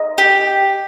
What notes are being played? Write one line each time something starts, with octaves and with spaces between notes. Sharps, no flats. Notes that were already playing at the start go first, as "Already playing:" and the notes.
Already playing: D#5
G4